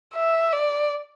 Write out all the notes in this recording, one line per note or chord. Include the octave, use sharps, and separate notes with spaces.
E5
D5